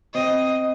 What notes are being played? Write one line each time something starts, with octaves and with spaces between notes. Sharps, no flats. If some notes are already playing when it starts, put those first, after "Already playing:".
C4 D#5